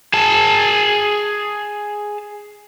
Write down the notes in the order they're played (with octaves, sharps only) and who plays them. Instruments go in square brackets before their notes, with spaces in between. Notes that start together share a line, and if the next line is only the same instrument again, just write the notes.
[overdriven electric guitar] G#4 A5